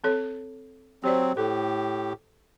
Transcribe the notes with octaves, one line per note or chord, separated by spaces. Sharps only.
C4 A4 C#5
F#3 C4 G4 C5 D5
A2 G4 A4